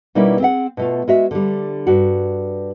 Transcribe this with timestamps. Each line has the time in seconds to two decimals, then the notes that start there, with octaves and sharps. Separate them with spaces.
0.15 B2 G3 A#3 C#4 D#4 E4
0.40 C4 G#4 E5 F#5
0.77 B2 A3 F4
1.08 G#3 F#4 E5
1.31 D3 G3
1.87 G2 F#4